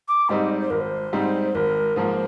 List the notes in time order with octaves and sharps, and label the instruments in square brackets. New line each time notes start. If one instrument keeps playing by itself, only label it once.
[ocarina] D6
[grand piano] G#2 G3 C4 D#4 [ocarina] D#5
[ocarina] D5
C5
[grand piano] G#1 [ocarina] A#4
[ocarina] C5
[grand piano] G#2 G3 C4 D#4
[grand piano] G#1 [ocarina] A#4
[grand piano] G#2 F3 A#3 [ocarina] C5